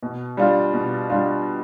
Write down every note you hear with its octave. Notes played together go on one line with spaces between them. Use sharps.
B2
G3 D4 F4
B2
G3 D4 F4